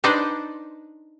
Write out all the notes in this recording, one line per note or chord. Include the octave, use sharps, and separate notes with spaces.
D4 D#4 B4 C5 D5